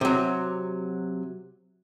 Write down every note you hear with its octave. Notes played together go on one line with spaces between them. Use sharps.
C3 F#3